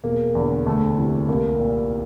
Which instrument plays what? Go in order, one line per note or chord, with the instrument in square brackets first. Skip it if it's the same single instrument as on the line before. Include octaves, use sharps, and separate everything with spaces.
[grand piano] E1 A#3
E2 D3
D2 A3
C3 E3
C2 A#3
A#2